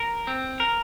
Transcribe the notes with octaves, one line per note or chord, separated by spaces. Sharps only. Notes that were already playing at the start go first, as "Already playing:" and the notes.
Already playing: A#4
C4
A#4